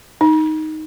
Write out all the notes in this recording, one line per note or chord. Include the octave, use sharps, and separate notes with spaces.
D#4